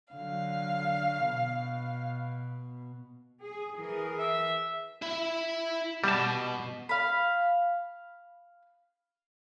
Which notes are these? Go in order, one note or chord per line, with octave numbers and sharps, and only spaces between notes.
D3 F#3 F5
B2
G#4
E3 G#4 A#4
E5
E4 E5
B2 G3 A5
F5 B5